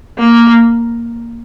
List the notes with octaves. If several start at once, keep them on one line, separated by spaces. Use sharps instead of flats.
A#3